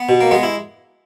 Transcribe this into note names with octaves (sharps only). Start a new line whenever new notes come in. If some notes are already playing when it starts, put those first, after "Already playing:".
Already playing: B3
B2
A#3
G#3 B3
E4